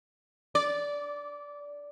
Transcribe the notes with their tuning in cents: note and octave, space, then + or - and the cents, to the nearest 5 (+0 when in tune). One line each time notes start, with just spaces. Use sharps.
D5 -15